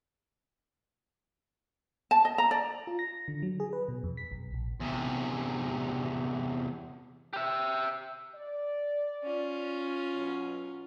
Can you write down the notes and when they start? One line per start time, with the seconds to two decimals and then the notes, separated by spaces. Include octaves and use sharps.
2.11 A5
2.25 D#5
2.38 A#5
2.51 D5
2.87 F4
2.99 A#6
3.28 D3
3.43 F#3
3.60 G#4
3.73 B4
3.88 B2
4.04 F2
4.17 B6
4.32 B1
4.54 A#1
4.80 E2 C3
7.33 G4 E5
8.36 D5
9.24 C#4 F4
10.15 B2 F#3